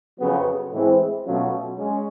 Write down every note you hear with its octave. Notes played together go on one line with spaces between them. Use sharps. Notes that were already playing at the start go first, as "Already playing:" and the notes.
F2 C#3 F#3 B3
A2 E3 G#3 C4 E4
B2 F#3 A3 C#4 F4
G#3 C#4